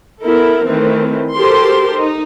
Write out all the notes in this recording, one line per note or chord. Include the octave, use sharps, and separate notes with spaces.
B3 E4 A4 A#4
D#3 E3 A3 C4
F#4 G4 A4 A#4 C5 C6
D#4